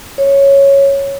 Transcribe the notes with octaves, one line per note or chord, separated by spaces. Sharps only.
C#5